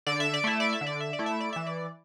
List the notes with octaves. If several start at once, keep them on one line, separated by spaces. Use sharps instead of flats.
D3 D5
E5
D5
A3 E4 E5
D5
E5
D3
D5
E5
D5
A3 E4
E5
D5
E3 E5
D5